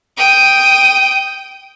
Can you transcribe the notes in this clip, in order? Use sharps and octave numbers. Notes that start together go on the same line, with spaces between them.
G5 D#6